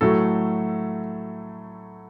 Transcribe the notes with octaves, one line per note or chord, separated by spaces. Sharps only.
A2 F#3 A3 A4